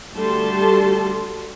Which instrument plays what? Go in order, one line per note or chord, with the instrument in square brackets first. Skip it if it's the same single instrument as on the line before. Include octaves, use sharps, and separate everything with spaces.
[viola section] D3 G3 A3 F#4 A5 C6